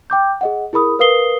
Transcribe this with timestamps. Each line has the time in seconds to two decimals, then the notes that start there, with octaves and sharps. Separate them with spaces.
0.10 G5 D6 G6
0.41 G#4 D#5 F#5
0.73 E4 G#4 A#4 B5 D#6
0.99 A#4 B4 F5 D#6 C7 G7